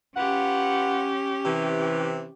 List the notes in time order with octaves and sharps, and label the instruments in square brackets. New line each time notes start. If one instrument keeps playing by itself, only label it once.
[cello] C#4 G4 [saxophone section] F4 B4 F#5
[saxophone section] C3 E3